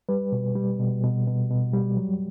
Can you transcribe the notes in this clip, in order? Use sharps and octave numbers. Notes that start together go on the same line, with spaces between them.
G3 B4
B2
G3
B2
B2
B2
B2
G3
F#3